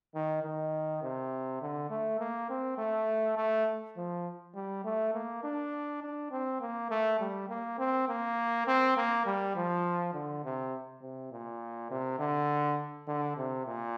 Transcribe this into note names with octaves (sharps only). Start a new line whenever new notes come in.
D#3
D#3
C3
D3
A3
A#3
C4
A3
A3
F3
G3
A3
A#3
D4
D4
C4
A#3
A3
G3
A#3
C4
A#3
C4
A#3
G3
F3
D3
C3
C3
A#2
C3
D3
D3
C3
A#2